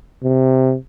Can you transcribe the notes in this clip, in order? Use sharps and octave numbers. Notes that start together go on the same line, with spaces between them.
C3